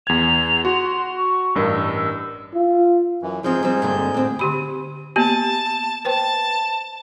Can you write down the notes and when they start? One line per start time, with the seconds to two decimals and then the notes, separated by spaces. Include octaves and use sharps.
0.07 E2 G#6 F7
0.65 F#4 C6
1.15 C#6
1.55 A1 G2 A#4 E6
2.54 F4
3.22 F#2 E3
3.44 G#2 F3 C4 G#4 G6
3.63 G3 C4
3.82 G2 A#2 D3
4.14 A2 C4
4.39 D3 G4 B5
5.16 A#3 B3 G4 A5
6.05 B4 C5 G5 A5